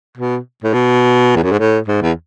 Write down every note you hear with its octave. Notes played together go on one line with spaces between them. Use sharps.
B2
A2
B2
E2
F#2
G#2
A2
G#2
E2